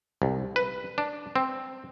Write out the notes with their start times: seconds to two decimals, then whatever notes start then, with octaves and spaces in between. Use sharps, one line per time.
0.22 C2
0.56 B4
0.98 D4
1.36 C4